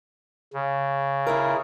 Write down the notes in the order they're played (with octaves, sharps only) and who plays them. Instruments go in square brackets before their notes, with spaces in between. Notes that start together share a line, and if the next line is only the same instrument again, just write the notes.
[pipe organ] C#3
[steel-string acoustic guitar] E4 F4 A#4